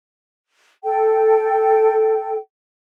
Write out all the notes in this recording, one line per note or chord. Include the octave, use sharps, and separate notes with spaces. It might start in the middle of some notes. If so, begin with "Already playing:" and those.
A4 G5